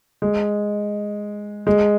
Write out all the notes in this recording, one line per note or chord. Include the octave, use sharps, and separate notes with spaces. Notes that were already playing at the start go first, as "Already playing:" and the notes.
G#3
G#3